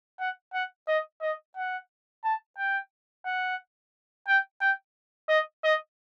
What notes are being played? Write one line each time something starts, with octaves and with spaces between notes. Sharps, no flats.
F#5
F#5
D#5
D#5
F#5
A5
G5
F#5
G5
G5
D#5
D#5